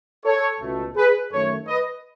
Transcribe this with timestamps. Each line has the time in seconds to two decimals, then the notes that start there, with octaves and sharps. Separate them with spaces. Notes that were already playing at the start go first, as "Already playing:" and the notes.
0.25 A4 C#5
0.61 C#2 B2 A3
0.96 G#4 B4
1.32 F#2 D#3 A3 A4 C#5
1.68 B4 D#5